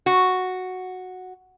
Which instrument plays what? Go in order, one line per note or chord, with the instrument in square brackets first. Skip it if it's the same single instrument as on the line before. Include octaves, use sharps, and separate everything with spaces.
[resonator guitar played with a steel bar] F#4